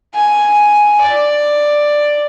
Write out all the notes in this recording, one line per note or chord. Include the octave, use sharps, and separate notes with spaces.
G#5
D5